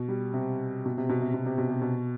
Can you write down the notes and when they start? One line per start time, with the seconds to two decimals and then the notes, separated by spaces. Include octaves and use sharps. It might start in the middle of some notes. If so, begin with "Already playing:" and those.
Already playing: B2
0.08 G3
0.33 C3
0.85 B2
0.97 C3
1.09 B2
1.21 C3
1.34 B2
1.46 C3
1.58 B2
1.70 C3
1.81 B2